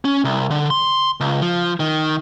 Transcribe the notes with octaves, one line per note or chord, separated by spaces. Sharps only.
C#4
C2
D3
C6
C#2
F3
D#3